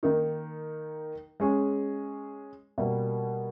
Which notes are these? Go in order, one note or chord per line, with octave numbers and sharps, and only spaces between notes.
D#3 A#3 D#4 A#4
G#3 C#4 G#4
B2 G3 A#3